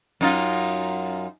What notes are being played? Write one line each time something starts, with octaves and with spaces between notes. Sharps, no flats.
F#2 D#4 F4